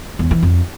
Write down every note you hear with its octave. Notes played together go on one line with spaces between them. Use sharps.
E2
E3
F2